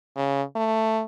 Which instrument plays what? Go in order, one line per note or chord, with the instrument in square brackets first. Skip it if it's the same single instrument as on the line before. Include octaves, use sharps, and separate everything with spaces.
[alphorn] C#3
A3